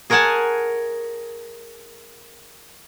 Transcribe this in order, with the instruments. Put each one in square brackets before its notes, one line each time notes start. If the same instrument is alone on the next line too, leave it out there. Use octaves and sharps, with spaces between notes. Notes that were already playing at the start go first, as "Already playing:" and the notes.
[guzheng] G#4 A#4 C#5 F#5 G#5 A5